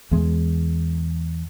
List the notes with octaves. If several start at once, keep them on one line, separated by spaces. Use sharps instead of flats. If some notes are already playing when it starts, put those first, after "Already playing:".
E2 G#3